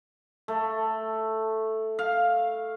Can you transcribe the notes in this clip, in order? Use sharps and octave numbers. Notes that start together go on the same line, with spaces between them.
A3
F5